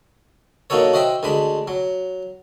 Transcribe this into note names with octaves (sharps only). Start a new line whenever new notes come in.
F#3 A#3 D#4 F#4 A4 C#5
F#4 C5 D#5 E5 G5
D2 G#3 D4 B5
F#3